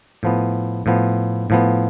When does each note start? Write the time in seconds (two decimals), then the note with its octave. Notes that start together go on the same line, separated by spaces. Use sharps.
0.23 A2 F3 B3
0.86 A2 F3 B3
1.50 A2 F3 B3